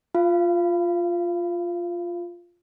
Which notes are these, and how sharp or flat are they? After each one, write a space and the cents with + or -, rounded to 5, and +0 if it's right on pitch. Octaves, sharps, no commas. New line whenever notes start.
F4 +0 F5 -30